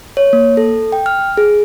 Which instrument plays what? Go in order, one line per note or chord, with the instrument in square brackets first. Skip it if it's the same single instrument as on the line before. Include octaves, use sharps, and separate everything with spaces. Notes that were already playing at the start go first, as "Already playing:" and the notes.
[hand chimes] C#5
A#3
A4
G5
F6
G#4